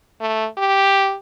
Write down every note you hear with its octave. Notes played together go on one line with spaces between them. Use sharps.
A3
G4